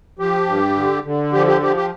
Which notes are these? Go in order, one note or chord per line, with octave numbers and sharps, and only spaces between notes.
F3 G4
G2
D3
D3
F3 G4
G4
F3 G4
G4